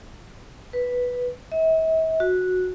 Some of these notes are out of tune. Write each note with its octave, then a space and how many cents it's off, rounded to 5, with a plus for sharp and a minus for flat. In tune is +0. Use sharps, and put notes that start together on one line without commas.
B4 -5
E5 -45
F#4 -10